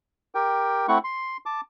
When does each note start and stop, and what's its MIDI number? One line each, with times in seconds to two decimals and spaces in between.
0.35 0.86 67
0.35 0.86 70
0.35 0.86 79
0.88 0.98 57
0.88 0.98 60
0.88 0.98 64
0.88 0.98 78
0.88 0.98 85
1.04 1.37 84
1.46 1.61 81
1.46 1.61 86